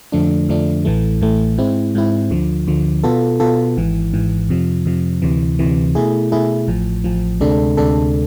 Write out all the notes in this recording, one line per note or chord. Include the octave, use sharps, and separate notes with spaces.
F2 D3 F3 A3 D4
F2 D3 F3 A3 D4
A1 A2 E3 A3
A1 A2 E3 A3
G#2 G#3 C4 E4
G#2 G#3 C4 E4
D2 D3 F3
D2 D3 F3
B2 B3 F4 A4
B2 B3 F4 A4
G#1 G#2 E3
G#1 G#2 E3
F2 C3 F3
F2 C3 F3
D2 C3 E3
D2 C3 E3
B2 A3 E4 G#4
B2 A3 E4 G#4
A1 A2 F3
A1 A2 F3
D2 C3 G#3 D4 A4
D2 C3 G#3 D4 A4